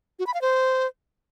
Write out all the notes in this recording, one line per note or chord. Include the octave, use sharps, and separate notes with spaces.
F#4
B5
F5
C5